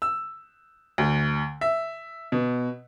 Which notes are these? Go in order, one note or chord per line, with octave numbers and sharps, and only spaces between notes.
E6
D2
E5
B2